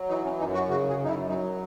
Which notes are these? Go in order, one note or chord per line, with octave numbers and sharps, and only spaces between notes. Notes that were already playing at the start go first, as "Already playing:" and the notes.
Already playing: F#3
E3 D#4
C#4
F#2 D#4
F#4
C#3 F#4
G#4
F#2 D#4
E4
F#3 D#4